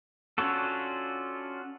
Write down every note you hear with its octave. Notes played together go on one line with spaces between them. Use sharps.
C#4 D4 F4 F#4 A4